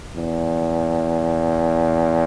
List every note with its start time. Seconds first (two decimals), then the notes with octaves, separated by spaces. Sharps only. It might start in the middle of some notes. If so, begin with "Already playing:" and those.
0.16 E2